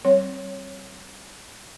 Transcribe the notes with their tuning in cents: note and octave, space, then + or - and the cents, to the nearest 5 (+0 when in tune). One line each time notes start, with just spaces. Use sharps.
G3 -25 C4 +20 C#5 +0